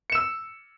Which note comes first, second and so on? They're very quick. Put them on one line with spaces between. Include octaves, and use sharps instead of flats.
C#7 E7 E6